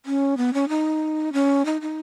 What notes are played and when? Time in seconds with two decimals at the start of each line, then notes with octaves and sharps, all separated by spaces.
0.06 C#4
0.37 B3
0.53 C#4
0.69 D#4
1.33 C#4
1.65 D#4
1.81 D#4